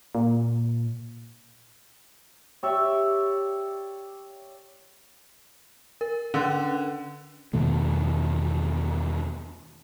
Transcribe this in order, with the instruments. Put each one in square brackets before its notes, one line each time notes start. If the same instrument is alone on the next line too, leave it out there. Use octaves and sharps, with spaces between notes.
[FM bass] A#2
[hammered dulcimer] G4 C#5 D5 E5
[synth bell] A#4
[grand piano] D3 [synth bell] C#4
[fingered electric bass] E2 B2 D#3 A3